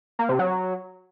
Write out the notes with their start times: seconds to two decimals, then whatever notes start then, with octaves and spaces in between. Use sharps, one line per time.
0.19 A#3
0.29 C3
0.39 F#3